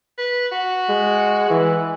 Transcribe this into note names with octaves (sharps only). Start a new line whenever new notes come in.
B4
F#4
G#3
E3